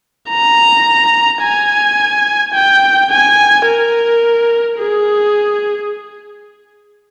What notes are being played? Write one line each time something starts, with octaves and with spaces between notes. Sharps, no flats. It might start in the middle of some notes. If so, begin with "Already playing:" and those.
A#5
G#5
G5
G#5
A#4
G#4